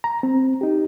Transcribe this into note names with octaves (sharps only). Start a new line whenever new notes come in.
A#5
C4
D#4 G4